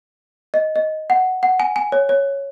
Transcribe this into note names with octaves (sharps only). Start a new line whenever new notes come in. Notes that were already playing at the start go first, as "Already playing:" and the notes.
D#5
D#5
F#5
F#5
G#5
G#5
C#5
C#5